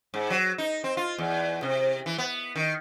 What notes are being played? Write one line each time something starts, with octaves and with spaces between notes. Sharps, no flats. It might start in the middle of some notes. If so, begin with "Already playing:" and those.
G#2
F#3
D#4
C4
F4
E2
C3
E3
B3
D#3